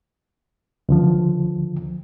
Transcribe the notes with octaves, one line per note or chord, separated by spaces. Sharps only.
C#2 D3 F3